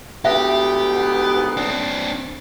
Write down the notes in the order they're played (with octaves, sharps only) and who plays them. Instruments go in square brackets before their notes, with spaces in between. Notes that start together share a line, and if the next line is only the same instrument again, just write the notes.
[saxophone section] D2 G#2 B3 [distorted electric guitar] G4 [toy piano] E5
[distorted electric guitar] C4 D4